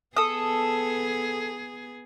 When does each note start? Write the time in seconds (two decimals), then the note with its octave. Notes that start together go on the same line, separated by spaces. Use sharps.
0.17 B3 G#4 A4 D#6